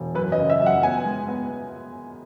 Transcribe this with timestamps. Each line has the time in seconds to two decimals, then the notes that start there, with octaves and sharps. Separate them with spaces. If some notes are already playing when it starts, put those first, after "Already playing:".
Already playing: E1
0.15 F#2 B4
0.32 D#5
0.38 C#3
0.50 E5
0.60 F#2
0.66 F#5
0.83 B3 G#5
1.05 G#3
1.28 B3